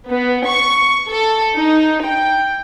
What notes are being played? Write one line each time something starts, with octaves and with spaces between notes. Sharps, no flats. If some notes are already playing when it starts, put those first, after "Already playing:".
B3
C#6
A4
D#4
G5